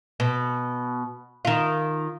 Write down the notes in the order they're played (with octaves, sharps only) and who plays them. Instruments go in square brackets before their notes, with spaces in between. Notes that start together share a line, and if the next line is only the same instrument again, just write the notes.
[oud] B2
D#3 F4